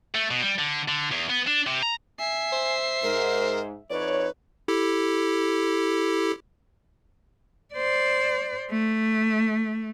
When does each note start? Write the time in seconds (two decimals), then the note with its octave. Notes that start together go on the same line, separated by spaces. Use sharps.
0.15 A3
0.31 B2
0.42 G3
0.58 D3
0.88 D3
1.12 E2
1.30 B3
1.47 D4
1.67 C3
1.83 A#5
2.19 E5 G#5 C7
2.52 C5
3.03 G#2 A#4
3.90 F2 D#4 B4 C#5 D5
4.68 E4 G4 A4
7.74 C5 D5
8.70 A3